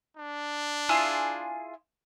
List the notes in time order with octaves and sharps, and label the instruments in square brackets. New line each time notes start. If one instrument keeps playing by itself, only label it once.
[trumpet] D4
[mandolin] E4 F4 G#4